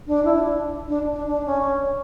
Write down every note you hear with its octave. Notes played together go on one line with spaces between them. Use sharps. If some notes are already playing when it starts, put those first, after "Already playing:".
D4
E4
D4
D4
D4
D4
C#4